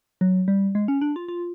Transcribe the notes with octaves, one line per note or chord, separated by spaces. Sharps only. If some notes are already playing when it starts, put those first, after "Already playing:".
F#3
G3
G#3
C#4
D4
F4
F4